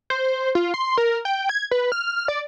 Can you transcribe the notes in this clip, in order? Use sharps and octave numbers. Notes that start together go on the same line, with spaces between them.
C5
F4
C6
A#4
G5
G#6
B4
F6
D5